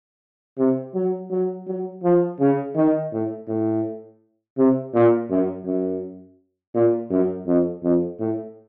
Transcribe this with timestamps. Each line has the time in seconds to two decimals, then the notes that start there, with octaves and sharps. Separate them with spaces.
0.58 C3
0.94 F#3
1.31 F#3
1.67 F#3
2.03 F3
2.40 C#3
2.76 D#3
3.13 A2
3.48 A2
4.58 C3
4.94 A#2
5.30 F#2
5.66 F#2
6.74 A#2
7.11 F#2
7.47 F2
7.83 F2
8.20 A2